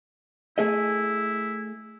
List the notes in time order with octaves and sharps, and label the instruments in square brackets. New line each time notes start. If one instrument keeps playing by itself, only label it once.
[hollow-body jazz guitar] A3 G#4 D#5 [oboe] E4